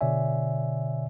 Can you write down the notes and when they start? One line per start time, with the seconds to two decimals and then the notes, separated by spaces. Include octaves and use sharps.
0.01 B2 D3 C#5 D5 E5 G#5